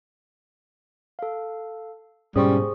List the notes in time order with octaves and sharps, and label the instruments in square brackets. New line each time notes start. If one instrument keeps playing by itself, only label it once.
[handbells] A4 F5
[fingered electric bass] G#2 B2 [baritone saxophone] G3 [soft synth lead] C#4 [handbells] G#4 C5 C#6